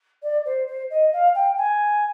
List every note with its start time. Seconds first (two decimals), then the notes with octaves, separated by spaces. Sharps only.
0.22 D5
0.45 C5
0.67 C5
0.90 D#5
1.13 F5
1.35 G5
1.57 G#5